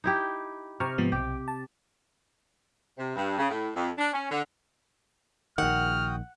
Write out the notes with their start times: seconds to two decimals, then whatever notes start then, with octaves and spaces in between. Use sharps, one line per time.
0.04 D#4 E4 G4
0.80 C3 A#5 C#6 F6
0.98 G#2 F3 B3
1.12 B1 G4 D6
1.48 A5
2.98 C3
3.16 G2
3.38 C#3
3.50 A2
3.76 F2
3.98 D4
4.13 C#4
4.31 D3
5.58 A#1 D#3 F#4 F#5 G5 D#6 F6